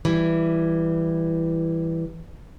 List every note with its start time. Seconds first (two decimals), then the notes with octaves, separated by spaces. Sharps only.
0.05 E3 G3